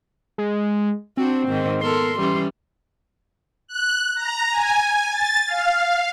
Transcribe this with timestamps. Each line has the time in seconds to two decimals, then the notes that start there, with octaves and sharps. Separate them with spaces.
0.38 G#3
1.17 C4 D4 F#4
1.48 G#2 D#3
1.81 B3 A4 A#4 C6
2.18 E3 G3 C#4
3.67 F#6
4.15 A#5
4.51 G#5
5.09 A6
5.46 F5